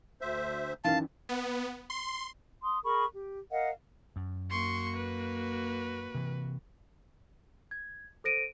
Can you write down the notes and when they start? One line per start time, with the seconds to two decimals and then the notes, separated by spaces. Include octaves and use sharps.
0.21 D2 C5 E5
0.84 F#2 D#3 E3 F5 A5
1.29 B3
1.90 C6
2.64 C6 D#6
2.84 G#4 A#4 B5 C#6
3.14 G4
3.52 A#4 D#5 F5 F#5
4.16 F#2
4.51 A#3 F#4 C6 C#6
4.97 B4
6.15 C3 E3
7.71 G#6
8.24 A4 C5 A#6 D7 D#7